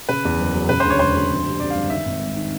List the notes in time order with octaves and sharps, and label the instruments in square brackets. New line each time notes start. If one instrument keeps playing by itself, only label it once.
[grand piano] C#3 [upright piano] B4
[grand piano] E2
F#1
F#3
[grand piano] C#3 [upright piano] B4
[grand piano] D2 [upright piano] C5
[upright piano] C#5
[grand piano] E1 [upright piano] C5
[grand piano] D2
F2
C3
[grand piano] C3 [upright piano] D5
[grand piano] G1 [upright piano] F5
[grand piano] D#3 [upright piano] E5
[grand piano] G#1
G#1
D#3